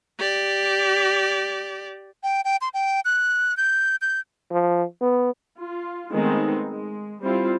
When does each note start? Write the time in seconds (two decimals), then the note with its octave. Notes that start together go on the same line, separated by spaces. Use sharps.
0.19 G4 D5
2.23 G5
2.45 G5
2.61 C6
2.74 G5
3.05 F#6
3.57 G6
4.02 G6
4.51 F3
5.01 B3
5.57 F4
6.12 D#3 G#3 A3 B3 C4 D#4
6.71 G#3
7.23 G3 C4 E4 F4